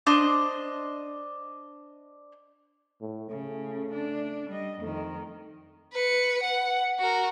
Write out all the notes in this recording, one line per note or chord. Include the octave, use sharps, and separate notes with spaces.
D4 C5 D#5
A2
C#3 A3
D4
G3 D#5
F2 D#3 A3
B4 C#7
F#5
F#4 A#4